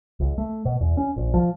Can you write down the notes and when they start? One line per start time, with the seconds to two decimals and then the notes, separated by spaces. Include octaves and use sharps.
0.20 C#2
0.38 A3
0.65 B2
0.81 E2
0.97 C#4
1.16 A#1
1.34 F3